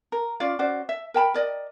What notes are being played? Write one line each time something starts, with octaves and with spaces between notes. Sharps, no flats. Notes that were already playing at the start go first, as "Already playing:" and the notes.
A#4
C#4 F4 D5 F5
C#4 F#4 C5 D5
E5
A#4 G5 A5 B5
A#4 D5 D#5